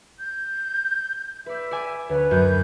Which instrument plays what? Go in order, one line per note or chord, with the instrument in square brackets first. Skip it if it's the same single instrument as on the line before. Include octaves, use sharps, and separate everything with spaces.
[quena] G6
[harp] B4 D5 [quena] E5
[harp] D5 G#5 D6
[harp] D2 [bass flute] B4 [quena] C#5
[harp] F#2 [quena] G6